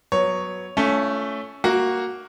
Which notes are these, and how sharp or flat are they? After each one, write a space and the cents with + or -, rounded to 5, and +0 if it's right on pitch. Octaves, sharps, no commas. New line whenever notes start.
F#3 +0 B3 +0 C#5 +0
A3 +0 C#4 +15 F4 -40
A#3 +0 F#4 +0